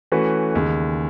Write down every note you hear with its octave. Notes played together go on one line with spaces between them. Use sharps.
E3 A3 C#4 F#4 B4
D#2 C#3 G#3